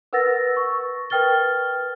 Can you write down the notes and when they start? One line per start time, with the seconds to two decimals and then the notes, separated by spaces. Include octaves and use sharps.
0.13 A#4 B4 F#5 E6 A6 A#6
0.57 C#6
1.10 A#4 B4 G5 F6 A6 G7